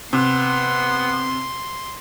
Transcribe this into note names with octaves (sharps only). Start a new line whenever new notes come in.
C3 B3 C6